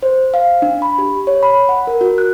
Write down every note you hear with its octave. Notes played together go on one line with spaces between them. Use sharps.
C5
F5
D4
B5
G4
C#5
B5
F#5
A#4
F#4
F#6